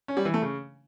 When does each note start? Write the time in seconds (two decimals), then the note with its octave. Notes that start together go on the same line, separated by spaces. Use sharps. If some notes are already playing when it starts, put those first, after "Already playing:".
0.08 C#4
0.17 G3
0.25 E3
0.34 A3
0.42 C#3